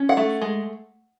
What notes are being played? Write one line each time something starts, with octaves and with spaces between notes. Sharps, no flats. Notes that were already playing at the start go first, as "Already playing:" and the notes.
Already playing: C#4
F#5
A3
G#3